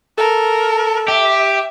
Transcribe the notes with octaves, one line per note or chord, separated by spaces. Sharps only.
A4 A#4
G4 E5